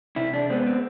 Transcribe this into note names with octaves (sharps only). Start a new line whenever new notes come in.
C3 E4
D4
G#3 B3 C4
C4